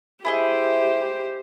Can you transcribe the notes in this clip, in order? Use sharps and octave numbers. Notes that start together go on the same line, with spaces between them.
E4 G4 G#4 C5 D#5